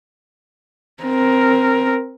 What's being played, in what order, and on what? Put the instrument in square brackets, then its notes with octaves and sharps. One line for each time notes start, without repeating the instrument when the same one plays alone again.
[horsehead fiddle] C4 A#4